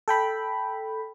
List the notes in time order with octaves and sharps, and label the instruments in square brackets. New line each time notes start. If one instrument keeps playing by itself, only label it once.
[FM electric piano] A4 G5 B5